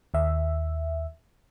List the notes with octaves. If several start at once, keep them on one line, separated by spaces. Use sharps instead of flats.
D#2 E5